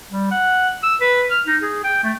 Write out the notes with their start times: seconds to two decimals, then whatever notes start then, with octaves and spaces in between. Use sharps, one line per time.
0.11 G3
0.31 F#5
0.83 E6
1.01 B4
1.31 F6
1.47 D#4
1.62 G#4
1.84 G5
2.03 A3